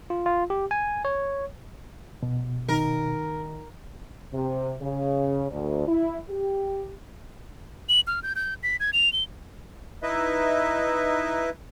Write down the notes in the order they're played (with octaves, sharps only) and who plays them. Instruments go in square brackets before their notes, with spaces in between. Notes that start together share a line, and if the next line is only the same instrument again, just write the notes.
[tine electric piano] F4
F4
G4
G#5
C#5
[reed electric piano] B2
[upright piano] D#3 [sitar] A#4
[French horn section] C3
C#3
D2
E4
G4
[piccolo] F#7
F6
G6
G6
B6
G#6
F7
G7
[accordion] D#4 E4 B4 D#5 E5